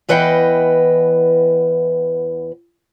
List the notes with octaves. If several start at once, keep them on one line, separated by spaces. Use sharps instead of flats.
E2 E3 B4 D#5 F#5 G5